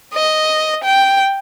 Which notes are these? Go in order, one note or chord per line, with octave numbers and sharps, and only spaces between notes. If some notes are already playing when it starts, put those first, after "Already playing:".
D#5
G5